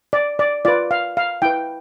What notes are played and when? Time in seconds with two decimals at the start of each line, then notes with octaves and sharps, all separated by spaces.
0.13 D5
0.39 D5
0.65 F4 B4 D5
0.91 F5
1.17 F5
1.42 E4 B4 G5